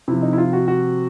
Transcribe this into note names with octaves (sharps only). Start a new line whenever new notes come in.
C3 F3 E4
D#4
E4
F4
F#4
F#4